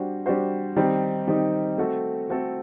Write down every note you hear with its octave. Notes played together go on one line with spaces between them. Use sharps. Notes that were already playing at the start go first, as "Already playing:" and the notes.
Already playing: G3 D4 F#4 C5
G3 D4 F#4 C5
D#3 G3 C4 D#4
D#3 G3 C4 D#4
A3 C4 F#4 A4
A3 C4 F#4 A4